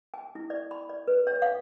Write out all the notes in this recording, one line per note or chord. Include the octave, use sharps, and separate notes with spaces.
G#5
E4
D5
B5
D5
B4
C#5
F5